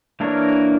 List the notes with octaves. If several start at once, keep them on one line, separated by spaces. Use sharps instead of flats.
E3 A#3 D4 A#4 C#5